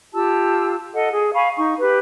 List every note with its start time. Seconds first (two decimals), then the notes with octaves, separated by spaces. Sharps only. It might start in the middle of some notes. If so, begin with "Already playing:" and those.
0.13 F4 G4 A5 E6
0.94 A4 D#5 F#5
1.12 G#4
1.35 F5 G#5 B5 C#6
1.56 D#4 C#6
1.80 G4 B4